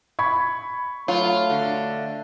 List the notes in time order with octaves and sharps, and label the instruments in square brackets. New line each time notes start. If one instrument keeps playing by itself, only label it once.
[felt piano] B5 C#6 G#6
[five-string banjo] F#3 [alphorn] A3 [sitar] F4
[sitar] D3